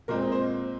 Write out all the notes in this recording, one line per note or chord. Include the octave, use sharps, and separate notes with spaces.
A#2 G#3 C4 A#4
D#5
C5